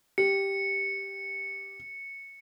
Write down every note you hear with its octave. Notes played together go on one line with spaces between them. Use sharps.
G4 C#7